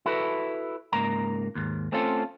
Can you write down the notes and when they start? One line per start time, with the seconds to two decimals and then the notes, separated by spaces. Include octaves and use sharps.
0.06 E4 F#4 A4 B4
0.93 C#2 G#2 A#3 A#5
1.55 D#2 G#2
1.92 A3 C4 C#4 F4 A4